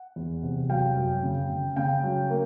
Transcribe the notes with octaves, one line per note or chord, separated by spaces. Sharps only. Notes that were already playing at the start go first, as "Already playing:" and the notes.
Already playing: F#5
E2
C3
F#3 F5 G5
F#2
C#3
C#3
C#3 F5 G5
F#3
A#3